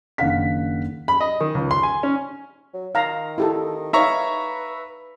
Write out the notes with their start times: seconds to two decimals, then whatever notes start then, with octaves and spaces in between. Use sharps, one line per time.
0.18 F#1 D#3 D4 F5 F#5 B6
1.08 B5
1.21 D#5
1.41 D#3
1.55 C#2
1.71 C6
1.83 G#5
2.03 C#4
2.73 F#3
2.95 D#3 F5 A#5
3.38 E4 G4 A4
3.93 D#4 B4 C#5 E5 F5 A#5 C#6